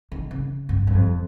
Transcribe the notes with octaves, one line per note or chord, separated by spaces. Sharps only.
D#3
C#3
G2
G2
F2